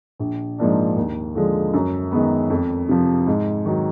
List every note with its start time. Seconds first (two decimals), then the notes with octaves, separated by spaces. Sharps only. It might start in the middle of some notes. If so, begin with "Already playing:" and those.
0.19 A#1
0.58 G#2 F3 A#3 D4
0.96 D#2
1.35 D3 F3 G#3
1.73 F#2
2.12 D#3 G#3 B3
2.50 F2
2.89 C3 F3
3.27 G#2
3.65 D#3 F#3